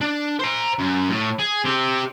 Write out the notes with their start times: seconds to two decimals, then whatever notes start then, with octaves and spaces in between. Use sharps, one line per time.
0.01 D4
0.40 C5 A#5
0.79 F#2
1.10 A2
1.39 G#4
1.65 C4 G4